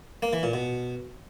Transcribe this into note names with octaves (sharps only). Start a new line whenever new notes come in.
A#3
E3
A#2
B2